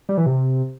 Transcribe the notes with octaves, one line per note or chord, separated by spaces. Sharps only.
G3
E3
C3